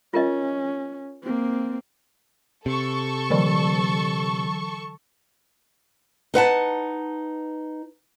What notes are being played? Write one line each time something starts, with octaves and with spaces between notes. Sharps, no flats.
C#4 F4 A#4 D#5
A#3 C4
C3 A4 C#6
D3 E3 F#3
D#4 B4 F#5 A5